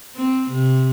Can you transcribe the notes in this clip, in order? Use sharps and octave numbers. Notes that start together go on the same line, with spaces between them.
C4
C3